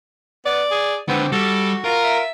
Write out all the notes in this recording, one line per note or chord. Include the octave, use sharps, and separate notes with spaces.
B3 D5
G#4
D3 G#3 B3 C4
G3 F#4 A4
F4 A#4
E5